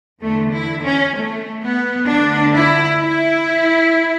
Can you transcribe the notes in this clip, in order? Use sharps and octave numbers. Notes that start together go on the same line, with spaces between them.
E2 D3 A3
E4
C#4
A3
B3
D2 D3 D4
E4
E4